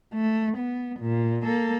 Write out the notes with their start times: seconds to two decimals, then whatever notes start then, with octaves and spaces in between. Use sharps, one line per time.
0.14 A3
0.58 B3
1.00 A#2
1.43 A#3 A4